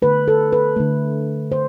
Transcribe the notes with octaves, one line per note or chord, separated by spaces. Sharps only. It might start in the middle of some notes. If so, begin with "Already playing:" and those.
D3 A3 B4
A4
B4
D3 A3
D3 C5